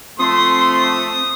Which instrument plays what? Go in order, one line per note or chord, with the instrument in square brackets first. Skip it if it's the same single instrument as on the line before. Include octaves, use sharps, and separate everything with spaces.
[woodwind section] F3 A3 [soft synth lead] C4 [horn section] C6 [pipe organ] D#6